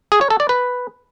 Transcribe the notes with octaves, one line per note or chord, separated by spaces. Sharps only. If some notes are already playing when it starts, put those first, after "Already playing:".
G#4
C#5
A4
D5
B4